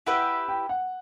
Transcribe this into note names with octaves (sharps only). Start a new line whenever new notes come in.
E4 G4 B4 E5 F#5
G5
F#5